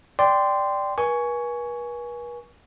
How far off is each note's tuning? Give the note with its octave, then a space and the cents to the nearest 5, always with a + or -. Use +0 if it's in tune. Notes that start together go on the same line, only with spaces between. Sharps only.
D5 +0 G5 +0 C6 -15
B4 -45 G#5 +5 C#6 +15